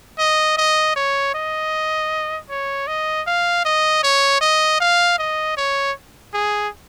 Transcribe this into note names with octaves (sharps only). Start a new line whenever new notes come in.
D#5
D#5
C#5
D#5
C#5
D#5
F5
D#5
C#5
D#5
F5
D#5
C#5
G#4